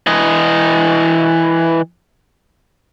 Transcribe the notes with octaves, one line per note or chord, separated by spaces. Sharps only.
E3 D#5